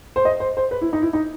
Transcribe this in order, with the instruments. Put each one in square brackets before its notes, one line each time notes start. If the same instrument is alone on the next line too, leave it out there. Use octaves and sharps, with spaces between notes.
[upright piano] C5
D#5
C5
C5
B4
E4
D#4
E4
D#4